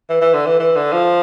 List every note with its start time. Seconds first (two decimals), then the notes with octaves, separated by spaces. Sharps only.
0.10 E3
0.21 E3
0.34 D3
0.46 E3
0.60 E3
0.76 D3
0.93 F3